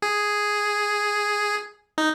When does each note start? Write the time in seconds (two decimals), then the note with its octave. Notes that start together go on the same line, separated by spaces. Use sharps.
0.02 G#4
1.98 D#4